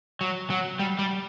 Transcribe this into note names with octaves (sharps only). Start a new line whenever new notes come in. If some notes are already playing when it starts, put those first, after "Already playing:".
F#3
F#3
G3
G3